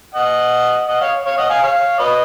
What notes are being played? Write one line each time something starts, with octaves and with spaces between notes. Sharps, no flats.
D#5 F#5
D#5 F#5
C#5 F5
C#5 F5
D#5 F#5
F5 G#5
C#5 F5
B4 D#5